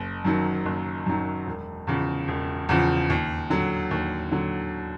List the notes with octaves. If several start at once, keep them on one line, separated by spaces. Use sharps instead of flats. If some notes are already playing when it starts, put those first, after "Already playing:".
Already playing: F#1
F#2 D#3 F#3
F#1
F#2 D#3 F#3
E1
E2 C#3 F3
E1
E2 C#3 F3
D#2
D3 F#3
D#2
D3 F#3